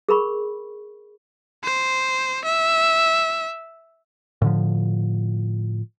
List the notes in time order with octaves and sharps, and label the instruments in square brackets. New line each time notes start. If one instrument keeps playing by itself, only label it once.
[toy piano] G#4 A#4 B5 C#6
[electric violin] C5
E5
[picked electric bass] A2 D3 F3